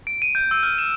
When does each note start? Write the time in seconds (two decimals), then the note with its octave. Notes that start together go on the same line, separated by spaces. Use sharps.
0.07 D7
0.22 D#7
0.35 G6
0.51 E6
0.63 F6
0.78 E7